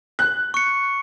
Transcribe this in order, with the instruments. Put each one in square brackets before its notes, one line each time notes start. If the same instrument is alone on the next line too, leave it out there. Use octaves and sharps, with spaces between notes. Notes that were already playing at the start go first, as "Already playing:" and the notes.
[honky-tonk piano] F#6
[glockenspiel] C#6 C#7